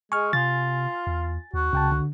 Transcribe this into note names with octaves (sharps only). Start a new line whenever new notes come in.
G#3 G#5 C#6 F6
C3 F4 A6
E2
D#2 F#4
C#2 C#3 G5 A5
D3